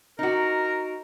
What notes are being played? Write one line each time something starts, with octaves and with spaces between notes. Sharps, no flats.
D#4 F#4 A#4